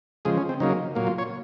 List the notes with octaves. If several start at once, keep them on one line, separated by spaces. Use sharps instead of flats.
C#3 F3 G#3 G#4
C#4
C4
C#3 F#3 A#3 D#4
A#2 F#3 A#3
F4
C#5